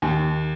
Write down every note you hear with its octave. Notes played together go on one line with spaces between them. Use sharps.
D#2